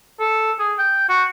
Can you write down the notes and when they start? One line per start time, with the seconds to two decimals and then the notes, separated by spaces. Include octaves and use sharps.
0.20 A4
0.59 G#4
0.78 G5
1.09 F#4